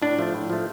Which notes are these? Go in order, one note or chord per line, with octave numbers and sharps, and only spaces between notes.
A2 D4
F3 A3
A2
F3 A3